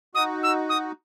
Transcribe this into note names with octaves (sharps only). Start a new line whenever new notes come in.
D#4 F#4 D#6
E6
D#6